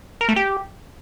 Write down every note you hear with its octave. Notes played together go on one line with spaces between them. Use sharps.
A#4
A3
G4